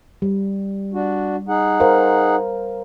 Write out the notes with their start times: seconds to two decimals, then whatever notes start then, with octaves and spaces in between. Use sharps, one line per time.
0.22 G3
0.94 D4 F#4
1.48 D#4 G#4 F#5
1.80 A#4 C5 F5